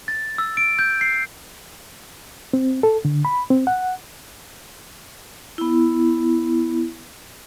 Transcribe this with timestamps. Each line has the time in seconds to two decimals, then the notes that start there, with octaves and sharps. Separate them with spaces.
0.08 A6
0.38 E6
0.57 D7
0.79 G6
1.01 C7
2.53 C4
2.83 A4
3.05 D3
3.25 B5
3.50 C4
3.67 F#5
5.58 B3 E4